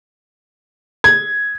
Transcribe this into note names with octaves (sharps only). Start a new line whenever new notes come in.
G#6